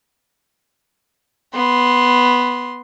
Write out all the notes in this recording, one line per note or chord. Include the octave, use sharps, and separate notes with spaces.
B3 C6